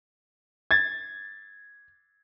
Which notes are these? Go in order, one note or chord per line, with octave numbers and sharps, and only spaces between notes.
G#6 A6